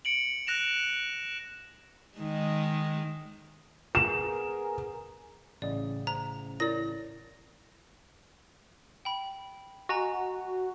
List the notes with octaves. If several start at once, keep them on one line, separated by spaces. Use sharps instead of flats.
C#7 D7 F#7
F#6 A#6 E7 F7
D#3 G#3
B3 G#4 A#4 E7
A1 C#3 D5 D#5
C5 A#5
E4 A#4 C#5 D5 A#6
G5 B5
F#4 D#5 G#5 A#5